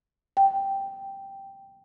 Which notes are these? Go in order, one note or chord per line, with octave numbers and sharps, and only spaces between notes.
G5